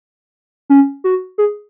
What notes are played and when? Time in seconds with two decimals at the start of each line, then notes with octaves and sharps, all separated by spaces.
0.70 C#4
1.04 F#4
1.38 G#4